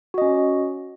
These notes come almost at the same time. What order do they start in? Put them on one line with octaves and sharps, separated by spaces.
F#4 D#5 C#4